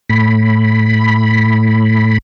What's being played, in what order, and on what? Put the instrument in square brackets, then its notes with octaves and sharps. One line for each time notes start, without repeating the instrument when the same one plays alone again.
[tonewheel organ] A2 B5